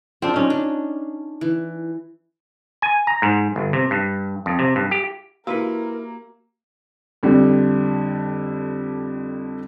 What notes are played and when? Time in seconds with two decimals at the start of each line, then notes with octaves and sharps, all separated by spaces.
0.22 C4 D4 F4
0.34 C#4 D#4
0.50 D4
1.41 E3
2.82 G#5
3.07 A#5
3.22 G#2
3.56 G1
3.73 C3
3.91 G2
4.46 F2
4.59 C3
4.76 G2
4.91 G4
5.47 A#3 E4 F#4 G4 A#4 B4 F5 E6
7.23 F2 D3 G3